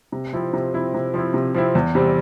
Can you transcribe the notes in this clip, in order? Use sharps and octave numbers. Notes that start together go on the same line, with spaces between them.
C3
F3 C4 E4
C3
F3 C4 E4
C3
F3 C4 E4
C3
F3 C4 E4
E2
C3 G3 C4